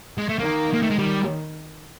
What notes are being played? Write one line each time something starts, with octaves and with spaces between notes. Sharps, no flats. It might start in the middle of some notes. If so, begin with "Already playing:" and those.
G#3
A3
D#3 A#3
A#3
A3
G#3
D#3 G3